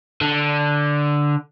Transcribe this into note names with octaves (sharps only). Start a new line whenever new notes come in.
D3